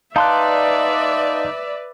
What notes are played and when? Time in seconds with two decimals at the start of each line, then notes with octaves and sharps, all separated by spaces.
0.16 D#4 B4 D5 E5 F5 A5 C6 F#6